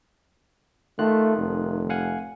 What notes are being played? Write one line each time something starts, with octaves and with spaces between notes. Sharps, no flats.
D#3 A3 F4 F#6
F1
F5 F#5 G#5